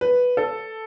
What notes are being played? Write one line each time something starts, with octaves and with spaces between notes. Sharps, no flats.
B4
A4